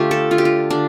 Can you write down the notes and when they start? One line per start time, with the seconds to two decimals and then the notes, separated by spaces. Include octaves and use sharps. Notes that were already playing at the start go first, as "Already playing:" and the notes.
Already playing: D3 A3 F4 G4
0.11 A4
0.31 D3 F4
0.38 G4
0.45 F4
0.70 D3 D4